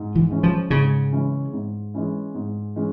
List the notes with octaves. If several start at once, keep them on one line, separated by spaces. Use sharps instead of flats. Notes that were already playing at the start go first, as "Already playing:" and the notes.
Already playing: G#2
E3
E3 G#3 C#4 E4
F3
G#2 C#3
E3 G#3 C#4 E4
G#2
E3 G#3 C#4 E4
G#2
E3 G#3 C#4